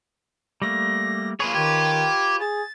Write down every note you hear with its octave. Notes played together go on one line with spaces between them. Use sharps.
G3 A3 A#3 A#6
A#3 F4 G#4 B4 C#5
D#3 G4 G#6
G#4 A6